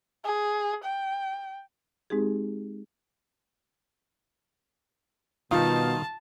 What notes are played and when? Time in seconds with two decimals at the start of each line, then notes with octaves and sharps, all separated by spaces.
0.25 G#4
0.84 G5
2.10 G#3 C4 D#4 G4 G#4
5.51 B2 D#3 G3 D#4 F4 A5